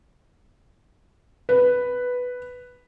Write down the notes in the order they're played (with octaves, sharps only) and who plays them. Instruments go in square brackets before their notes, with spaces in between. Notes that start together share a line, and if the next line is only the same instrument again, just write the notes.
[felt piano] B4